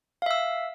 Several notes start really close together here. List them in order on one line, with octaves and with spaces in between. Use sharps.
F5 E5 E6